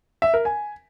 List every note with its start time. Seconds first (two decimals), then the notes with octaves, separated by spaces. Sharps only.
0.22 E5
0.34 A#4
0.45 G#5